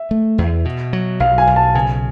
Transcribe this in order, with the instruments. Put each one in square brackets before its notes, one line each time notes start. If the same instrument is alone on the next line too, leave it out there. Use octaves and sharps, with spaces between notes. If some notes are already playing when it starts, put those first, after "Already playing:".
Already playing: [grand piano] E5
[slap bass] A3
E2
B2
F#3
[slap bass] B1 [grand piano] F5
[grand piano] G#5
[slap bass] B1
[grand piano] A5
[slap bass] C#3 [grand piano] G#5